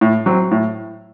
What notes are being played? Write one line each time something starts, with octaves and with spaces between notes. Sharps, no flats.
A2
F#3 C4
A2